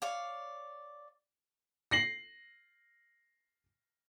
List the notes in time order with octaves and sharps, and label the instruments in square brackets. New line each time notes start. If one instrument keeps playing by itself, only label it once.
[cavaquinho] C#5 D5 F5
[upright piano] A#6 C7 F#7